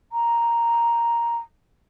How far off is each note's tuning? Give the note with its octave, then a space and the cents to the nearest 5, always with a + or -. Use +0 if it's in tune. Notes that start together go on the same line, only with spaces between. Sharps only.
A#5 +0